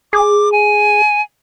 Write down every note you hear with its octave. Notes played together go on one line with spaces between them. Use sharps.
G#4 D6
G#5